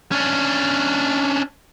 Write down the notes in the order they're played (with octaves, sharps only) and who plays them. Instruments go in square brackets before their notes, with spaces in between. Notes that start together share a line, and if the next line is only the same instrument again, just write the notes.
[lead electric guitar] C#4 D4